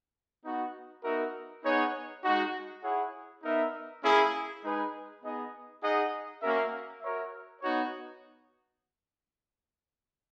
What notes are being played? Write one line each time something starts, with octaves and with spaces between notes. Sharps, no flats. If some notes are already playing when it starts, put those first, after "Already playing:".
B3 D#4 F#4
B3 D#4 F#4 A#4 E5
B3 D#4 G#4 C#5 F#5
G#3 D#4 F#4
E4 G#4 C#5 F#5
B3 D#4 A#4 E5
A#3 C#4 E4 G#4
G#3 D#4 G#4 B4
B3 D#4 G#4 D#5
D#4 G#4 D#5 F#5
A#3 C#4 F#4 A#4 E5
F#4 A#4 C#5 E5
B3 D#4 F#4 C#5